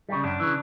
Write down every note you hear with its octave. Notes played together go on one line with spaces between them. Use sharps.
C#3 G3
F#2 D4
C#3 E3